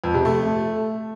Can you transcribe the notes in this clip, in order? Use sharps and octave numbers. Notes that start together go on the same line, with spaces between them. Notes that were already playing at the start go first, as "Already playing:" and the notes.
F2
C3
A3